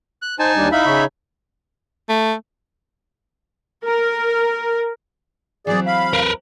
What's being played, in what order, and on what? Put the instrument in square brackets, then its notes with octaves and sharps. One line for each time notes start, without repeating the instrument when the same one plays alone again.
[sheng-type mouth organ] F#6
[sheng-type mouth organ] D#4 G#5 A5 [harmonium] C5
[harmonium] D#2 G3 D4
[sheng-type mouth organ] D#4 E5 B5 [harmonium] E4 F5
[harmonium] C#3 C#5
[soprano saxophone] A3
[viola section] A#4
[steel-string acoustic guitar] E3 F#3 C4 [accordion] G#4 D5
[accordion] F5 B5
[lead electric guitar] A#4 B4